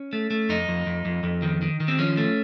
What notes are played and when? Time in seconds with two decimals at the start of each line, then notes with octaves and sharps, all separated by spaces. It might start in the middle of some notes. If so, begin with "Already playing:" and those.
Already playing: C#4
0.13 A3
0.31 A3
0.49 F2 D#4
0.68 F2
0.86 F2
1.05 F2
1.23 F2
1.42 D#3
1.62 D#3
1.80 D#3
1.88 C4
1.98 F3 C#4
2.17 A3